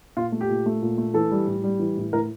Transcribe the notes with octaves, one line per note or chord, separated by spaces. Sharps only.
A#2 F4
A3
G4
A#2
A3
A#2
A3
E3 A4
G3
A2
G3
E3
A2
A2 A#4